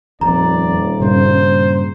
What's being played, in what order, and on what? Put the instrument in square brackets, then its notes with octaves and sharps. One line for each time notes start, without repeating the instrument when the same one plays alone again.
[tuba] D#1 [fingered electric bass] F2 [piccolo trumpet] D5 [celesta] A#5
[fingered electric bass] G2 A#2 C#3 [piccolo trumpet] C5